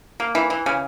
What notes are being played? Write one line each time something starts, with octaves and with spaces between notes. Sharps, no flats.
A#3
E3
E3
C#3